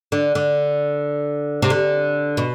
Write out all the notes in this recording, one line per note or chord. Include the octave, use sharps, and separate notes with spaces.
D3
D3
C3
D3
B2